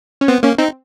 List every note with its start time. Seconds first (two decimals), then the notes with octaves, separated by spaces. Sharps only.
0.21 C#4
0.28 B3 C4
0.43 A#3 C#4
0.58 C4 D#4